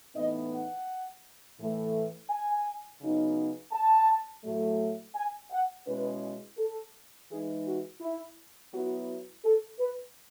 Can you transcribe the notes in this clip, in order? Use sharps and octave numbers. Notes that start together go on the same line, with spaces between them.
A2 E3 B3 D#4 D#5
F#5
A2 E3 A3
G#5
C#3 F#3 B3 D#4
A5
A2 F#3 A3
G#5
F#5
B2 G#3 C#4 E4 B4
A4
E3 G#3 D#4 G#4
F#4
E4
F#3 B3 E4 F#4
A4
B4